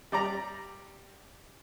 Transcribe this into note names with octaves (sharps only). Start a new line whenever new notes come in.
G3 D5 A#5